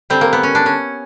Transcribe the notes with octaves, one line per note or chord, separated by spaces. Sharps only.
D3 G3 C4
A#3
B3
C#4
D4
C#4